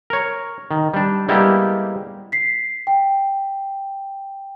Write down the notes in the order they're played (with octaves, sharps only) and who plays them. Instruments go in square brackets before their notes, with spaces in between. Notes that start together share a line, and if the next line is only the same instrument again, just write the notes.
[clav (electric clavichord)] A#4 C#5
D#3
G3 D4
G3 G#3 A#3 B3 E4 G4
[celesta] B6 C7
G5